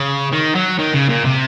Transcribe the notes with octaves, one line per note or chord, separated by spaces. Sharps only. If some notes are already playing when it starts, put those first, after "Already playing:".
Already playing: C#3
D#3
F#3
D#3
C#3
A#2
C3